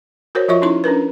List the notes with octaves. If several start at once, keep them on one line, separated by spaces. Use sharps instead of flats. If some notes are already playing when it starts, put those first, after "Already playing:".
F#4 A#4 C5 C#5
F3 F4 C#5 E5 C#6
C#4 D#4 E4 C6
C#4 D4 A#4 B4